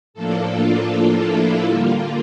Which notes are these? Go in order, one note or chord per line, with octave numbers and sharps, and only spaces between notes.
A2 F3 A#3 D4 A4
F4
F4
E4
D3 G3 A#3 F4